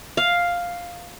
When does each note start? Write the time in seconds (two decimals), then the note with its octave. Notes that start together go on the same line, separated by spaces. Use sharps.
0.17 F5